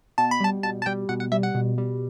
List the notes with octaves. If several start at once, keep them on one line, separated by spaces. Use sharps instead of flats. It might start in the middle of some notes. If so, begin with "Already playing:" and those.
B2 A5
B5
G3 A5
B2 A5
A5
G3 G5
B2 F#5
F#5
G3 E5
F#5
B2
G3